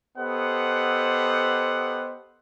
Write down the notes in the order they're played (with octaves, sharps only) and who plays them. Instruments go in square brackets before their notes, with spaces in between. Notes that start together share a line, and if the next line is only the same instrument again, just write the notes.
[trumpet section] B3 G4 A4 C5 D#5 F#5